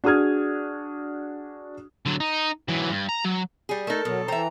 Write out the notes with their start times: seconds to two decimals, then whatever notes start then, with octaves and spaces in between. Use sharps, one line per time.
0.04 D4 F#4 G#4 D#6 F6 G#6
2.06 D3 F#3
2.20 D#4
2.68 E3 F#3
2.90 G2
3.09 A#5
3.25 F#3
3.69 G3 G#4
3.87 A3 D#4 A4 A#4
4.05 B2 F#3
4.28 E3 C5 E5 G5 A#5